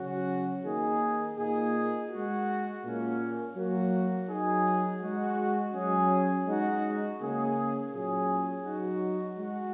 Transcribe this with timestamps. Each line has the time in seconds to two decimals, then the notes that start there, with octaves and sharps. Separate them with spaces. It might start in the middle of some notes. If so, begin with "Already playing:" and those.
Already playing: C#3 F#3 C#4 F#4
0.64 D#3 A#3 D#4 G#4
1.37 A#2 A#3 D#4 G#4
2.10 G#3 F#4
2.82 A#2 A#3 C#4
3.55 F#3 A#3 F#4
4.28 F#3 D#4 G#4
5.00 G#3 F#4
5.73 F#3 C#4 G#4
6.45 G#3 D#4 F#4
7.19 C#3 A#3 C#4 G#4
7.91 A#2 F#3 C#4 G#4
8.64 F#3 D#4 F#4
9.36 G#3 F#4